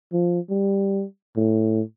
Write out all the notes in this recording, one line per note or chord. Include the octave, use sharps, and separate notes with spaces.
F3
G3
A2